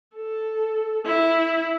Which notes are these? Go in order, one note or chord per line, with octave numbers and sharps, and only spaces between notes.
A4
E4